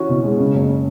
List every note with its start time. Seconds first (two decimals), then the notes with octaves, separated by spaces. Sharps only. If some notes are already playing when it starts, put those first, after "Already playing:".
Already playing: E3 C#4 F#4
0.09 B2
0.24 G#3
0.39 C#3
0.54 F#1